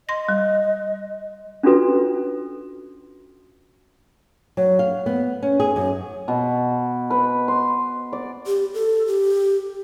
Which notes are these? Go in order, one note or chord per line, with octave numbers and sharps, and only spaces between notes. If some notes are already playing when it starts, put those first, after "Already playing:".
D#5 C6 A#6
G3
C#4 D4 F4 F#4 A4 B4
F#3
F5
B3
C#4
G#4
F#2
B2
B4
C6
D5
G4
A4
G4